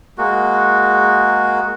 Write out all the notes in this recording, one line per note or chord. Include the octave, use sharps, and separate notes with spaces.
G#3 A#3 F#4